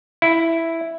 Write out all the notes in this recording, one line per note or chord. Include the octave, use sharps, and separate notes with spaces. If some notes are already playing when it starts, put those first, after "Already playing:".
E4